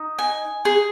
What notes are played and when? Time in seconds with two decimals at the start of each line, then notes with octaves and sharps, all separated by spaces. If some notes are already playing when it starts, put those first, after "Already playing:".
Already playing: D#4
0.19 G#5
0.65 G#4